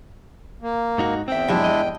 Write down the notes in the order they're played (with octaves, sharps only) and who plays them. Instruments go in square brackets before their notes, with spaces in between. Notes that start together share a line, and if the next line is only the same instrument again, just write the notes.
[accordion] A#3
[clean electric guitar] G#2 D#4 F#4
[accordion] E2 G5 [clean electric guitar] C4 E5
[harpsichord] G2 C3 F3 [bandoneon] G#3 D4 E4
[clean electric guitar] D#5